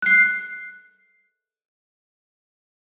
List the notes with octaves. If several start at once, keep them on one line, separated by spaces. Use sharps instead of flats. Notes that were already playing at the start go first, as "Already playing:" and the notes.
F#6 C7